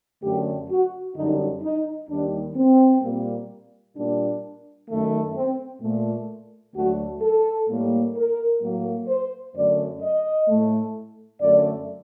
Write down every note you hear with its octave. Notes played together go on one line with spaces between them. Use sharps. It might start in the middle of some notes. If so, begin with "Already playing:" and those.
F#2 D3 A3 G4
F#4
F#2 D3 G3 D#4
D#4
D#2 D#3 G3 D4
C4
A#2 G3 A#3
A#2 G3 A#3 D4
F#2 D#3 A3
C4
A#2 A3
D2 D3 F#3 A3 F#4
A4
A2 G3 A#3
A#4
A2 F#3 A#3
C5
F#2 D3 A3 D5
D#5
A2 A3
F#2 D3 A3 D5